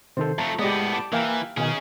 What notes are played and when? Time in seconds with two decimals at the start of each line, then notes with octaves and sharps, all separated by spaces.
0.17 C3 D#3 A4 C5
0.38 F2 A3 A5 A#5
0.59 A2 G#3 B3 G4 D5 D#5
0.92 A5 D6
1.13 E3 A#3 E5 F5 G5 G#5 A#5
1.57 B2 D#3 C#4 D#4 G#4 G#5 F6